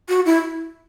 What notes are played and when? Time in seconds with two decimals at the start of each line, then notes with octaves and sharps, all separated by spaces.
0.09 F#4
0.26 E4